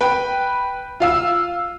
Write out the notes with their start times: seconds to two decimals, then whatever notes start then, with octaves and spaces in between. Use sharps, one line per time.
0.01 B4 G5
1.00 F4 F5 E6